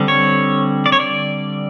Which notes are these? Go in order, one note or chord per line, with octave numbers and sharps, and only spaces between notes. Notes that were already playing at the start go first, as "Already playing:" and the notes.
Already playing: D3 G3 C4
C#5
D5
C#5
D5